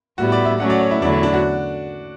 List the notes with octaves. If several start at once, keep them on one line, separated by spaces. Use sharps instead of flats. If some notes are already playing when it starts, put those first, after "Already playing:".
A2 G3 B3 E4 F#4
D5
E5
F#3 A3 C#4 F#5
D5
C#5
E4
E2 D3 F#3 A3 D4 E4
D4
D4
F#4